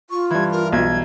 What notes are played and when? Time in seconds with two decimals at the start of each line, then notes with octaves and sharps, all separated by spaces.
0.10 F4 C#6
0.30 G2 E3 G#6
0.52 A#4
0.72 B1 G#6